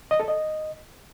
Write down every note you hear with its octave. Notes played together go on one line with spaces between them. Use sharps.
D#5
A4
D#5